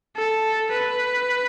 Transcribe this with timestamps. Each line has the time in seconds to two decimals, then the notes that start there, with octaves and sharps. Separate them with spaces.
0.16 A4
0.71 B4